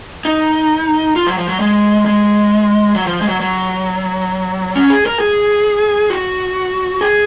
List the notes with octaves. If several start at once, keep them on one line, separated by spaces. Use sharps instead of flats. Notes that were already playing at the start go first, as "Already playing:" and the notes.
D#4
F4
F#3
F3
F#3
G#3
G#3
F#3
F3
G#3
F#3
F#3
C#4
G#4
A#4
G#4
F#4
G#4